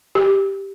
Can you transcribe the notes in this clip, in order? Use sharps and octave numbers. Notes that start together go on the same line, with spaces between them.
G4